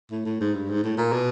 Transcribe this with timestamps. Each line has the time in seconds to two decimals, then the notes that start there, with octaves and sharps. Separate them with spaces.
0.11 A2
0.26 A2
0.41 G#2
0.54 G2
0.70 G#2
0.84 A2
0.98 A#2
1.13 B2